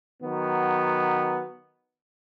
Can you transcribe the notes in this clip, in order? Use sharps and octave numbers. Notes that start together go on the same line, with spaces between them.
D#3 F#3 B3